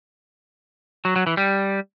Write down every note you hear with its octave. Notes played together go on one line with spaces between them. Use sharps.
F#3
F#3
E3
G3